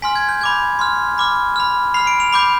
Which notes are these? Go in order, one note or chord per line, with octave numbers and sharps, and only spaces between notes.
G#5 C6 F6 B6
G#6
G6
B5 D6 G6 G#6
C6 F6
B5 D6 F6
B5 F6
B5 F6 C7
D7
F7
B5 D6 G6